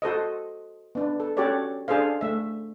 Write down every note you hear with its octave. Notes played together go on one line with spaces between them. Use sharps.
F#4 A4 C5 D#5
B3 D4
A4
C#4 F#4 G4 A4 C#5 D5
D4 G#4 A4 C5 F5
A3 E5